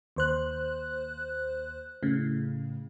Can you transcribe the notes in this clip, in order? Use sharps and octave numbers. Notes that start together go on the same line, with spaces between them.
D#2 C5 F#6
A2 C#3